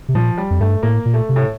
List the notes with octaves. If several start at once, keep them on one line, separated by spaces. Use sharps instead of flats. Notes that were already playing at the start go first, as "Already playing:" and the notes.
C3
A#2 F3
G3
F2
G2 A3
A2 A#3
A#2
A3
C3
A2